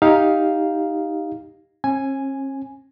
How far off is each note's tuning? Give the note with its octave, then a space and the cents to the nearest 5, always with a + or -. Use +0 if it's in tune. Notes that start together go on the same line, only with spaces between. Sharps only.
D#4 +10 G4 +0 F5 +0
C#4 -45 G#5 +0